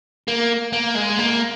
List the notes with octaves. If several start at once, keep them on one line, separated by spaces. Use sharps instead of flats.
A#3
A#3
G#3
A#3